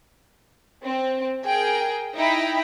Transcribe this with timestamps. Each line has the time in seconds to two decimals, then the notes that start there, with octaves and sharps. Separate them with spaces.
0.83 C4
1.45 G#4 A#4 G5
2.15 D#4 E4 G5 A#5 B5